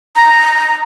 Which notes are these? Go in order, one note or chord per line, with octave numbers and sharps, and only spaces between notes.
A#5